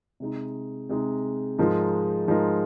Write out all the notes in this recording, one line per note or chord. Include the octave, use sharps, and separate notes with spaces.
C3 G#3 D#4
C3 G#3 D#4
G#2 F3 G#3 D#4 A#4
G#2 F3 G#3 D#4 A#4